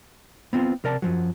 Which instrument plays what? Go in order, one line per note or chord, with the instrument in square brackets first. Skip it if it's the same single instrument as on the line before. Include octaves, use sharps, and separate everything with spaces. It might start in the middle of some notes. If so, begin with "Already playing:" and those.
[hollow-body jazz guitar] B3 C4 F4
C3 A#4 D5 A5
F#2 F3 F#3